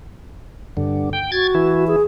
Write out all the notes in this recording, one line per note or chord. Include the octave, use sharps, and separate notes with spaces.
G2 D3
G5
F#4 G#6 A6
E3 E4
G#4